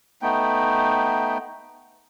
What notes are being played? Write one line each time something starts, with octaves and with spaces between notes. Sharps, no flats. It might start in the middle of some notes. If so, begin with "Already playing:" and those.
A3 B3 D#4 G5